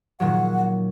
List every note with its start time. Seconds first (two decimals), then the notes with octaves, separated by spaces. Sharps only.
0.20 A#2 D#3 F#3 F#5